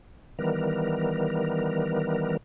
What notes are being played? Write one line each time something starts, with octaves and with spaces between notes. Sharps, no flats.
D#3 E3 G3 B3 A#4